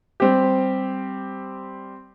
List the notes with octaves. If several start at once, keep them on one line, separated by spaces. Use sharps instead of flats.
G3 C4 G4